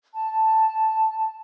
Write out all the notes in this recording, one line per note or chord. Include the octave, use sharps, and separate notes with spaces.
A5